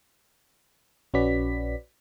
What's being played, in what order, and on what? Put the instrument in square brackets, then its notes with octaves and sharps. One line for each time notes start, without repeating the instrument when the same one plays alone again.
[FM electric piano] A#1 C#4 F#4 B4 D5 B6